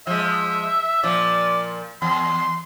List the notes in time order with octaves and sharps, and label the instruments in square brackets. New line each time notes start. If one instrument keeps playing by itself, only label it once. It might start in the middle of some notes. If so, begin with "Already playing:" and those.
[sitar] F3 G#3 [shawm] E5
[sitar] A#2 F3 [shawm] D5
[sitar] E2 [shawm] C6